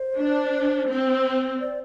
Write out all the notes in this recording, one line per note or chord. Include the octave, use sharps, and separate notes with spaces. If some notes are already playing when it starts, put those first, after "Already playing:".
Already playing: C5
D4
C4
D5